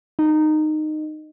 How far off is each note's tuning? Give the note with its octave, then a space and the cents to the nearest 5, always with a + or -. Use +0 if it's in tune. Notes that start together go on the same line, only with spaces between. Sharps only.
D#4 -15